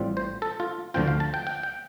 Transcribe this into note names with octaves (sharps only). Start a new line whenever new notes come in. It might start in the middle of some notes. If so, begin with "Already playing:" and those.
Already playing: A1 A2 G3 C4 F4
C5
A4
F4
D2 D3 F3 C4 F4 G5
F5
A5
G5
G5
G5